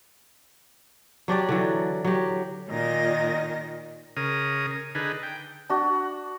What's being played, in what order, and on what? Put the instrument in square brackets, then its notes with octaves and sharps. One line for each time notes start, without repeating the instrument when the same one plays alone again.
[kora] F#3 D4 G4 D5
D3 E3 F#3
F#3 G4
[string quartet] A#2 D#3 D#5 A#6
[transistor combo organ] C#3 A#4 D#6
D3 D#4 G#4 B4
G5
[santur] D4 F#4